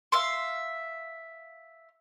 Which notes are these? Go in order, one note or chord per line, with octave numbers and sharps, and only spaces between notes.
E5 F5 C6